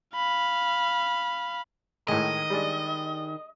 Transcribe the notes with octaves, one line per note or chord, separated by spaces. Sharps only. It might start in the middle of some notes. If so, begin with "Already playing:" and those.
F5 B5
A2 D#3 G#3 D#5
G3 G#3 D4